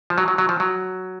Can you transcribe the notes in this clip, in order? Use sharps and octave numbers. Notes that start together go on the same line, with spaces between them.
F3
F#3
F#3
F#3
F3
F#3